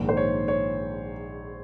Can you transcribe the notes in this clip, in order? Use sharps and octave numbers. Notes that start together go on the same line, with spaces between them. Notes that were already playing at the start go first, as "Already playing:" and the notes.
Already playing: A#1 G#2 D#3
C5
C#5
C#5